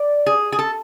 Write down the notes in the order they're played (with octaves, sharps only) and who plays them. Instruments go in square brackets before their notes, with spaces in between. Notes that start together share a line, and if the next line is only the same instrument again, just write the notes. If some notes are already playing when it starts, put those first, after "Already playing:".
Already playing: [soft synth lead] D5
[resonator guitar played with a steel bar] G#4
G#4
A4